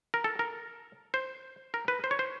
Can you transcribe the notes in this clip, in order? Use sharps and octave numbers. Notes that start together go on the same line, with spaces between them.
A#4
A4
A#4
C5
A#4
B4
C5
C#5
C5